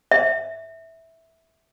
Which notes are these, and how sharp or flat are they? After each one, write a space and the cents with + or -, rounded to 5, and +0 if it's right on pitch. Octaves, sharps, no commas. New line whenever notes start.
E5 -10